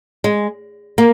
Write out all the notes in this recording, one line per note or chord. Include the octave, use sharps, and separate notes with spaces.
G#3
A#3